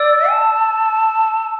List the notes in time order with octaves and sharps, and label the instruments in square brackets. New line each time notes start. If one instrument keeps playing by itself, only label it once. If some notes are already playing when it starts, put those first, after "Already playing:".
Already playing: [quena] D5 [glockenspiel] E6
[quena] A5